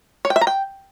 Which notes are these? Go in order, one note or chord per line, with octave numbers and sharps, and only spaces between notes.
C#5
G5
E5
A#5
G5